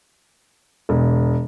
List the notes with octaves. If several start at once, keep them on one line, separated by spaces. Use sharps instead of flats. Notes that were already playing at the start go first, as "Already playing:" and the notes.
E1